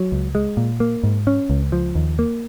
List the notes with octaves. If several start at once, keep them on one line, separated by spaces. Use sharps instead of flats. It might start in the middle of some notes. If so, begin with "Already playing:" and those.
Already playing: F#3
C#2
G#3
A#2
A#3
G#2
C#4
C#2
F3
D#2
A#3